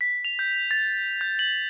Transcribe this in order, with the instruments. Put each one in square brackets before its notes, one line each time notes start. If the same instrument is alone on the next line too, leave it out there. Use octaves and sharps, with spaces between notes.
[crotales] B6
F7
G6
A6
G6
F#7